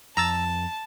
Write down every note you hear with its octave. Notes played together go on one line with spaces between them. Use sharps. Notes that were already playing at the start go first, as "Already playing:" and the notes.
F2 A5 A#5 E6 A6